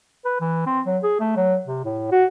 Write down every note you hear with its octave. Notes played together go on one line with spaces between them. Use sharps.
B4
E3
C4
F#3
G#4
A3
F#3
C3
A2
F#4